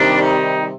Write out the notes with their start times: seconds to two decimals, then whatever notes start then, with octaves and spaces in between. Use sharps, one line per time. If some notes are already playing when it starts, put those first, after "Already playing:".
Already playing: C3 D#3 G3 D4
0.22 D#4